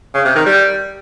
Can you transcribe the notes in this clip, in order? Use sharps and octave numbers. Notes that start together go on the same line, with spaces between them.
C#3
C3
D#3
G3